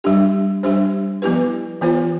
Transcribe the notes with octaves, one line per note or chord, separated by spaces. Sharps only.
G3 D4 G4
G3 D4 G4 C5
F3 B3 E4 G4 B4
E3 B3 F4 C5